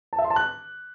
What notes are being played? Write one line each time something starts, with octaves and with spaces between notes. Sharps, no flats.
A5
E5
C6
A5
F#6